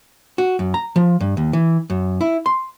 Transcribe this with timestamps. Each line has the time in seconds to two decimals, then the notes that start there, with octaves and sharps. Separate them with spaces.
0.38 F#4
0.59 F#2
0.74 A#5
0.96 F3
1.20 G2
1.37 D#2
1.53 E3
1.90 F#2
2.21 E4
2.46 C6